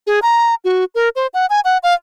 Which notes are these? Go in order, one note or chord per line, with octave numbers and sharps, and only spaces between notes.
G#4
A#5
F#4
A#4
C5
F#5
G#5
F#5
F5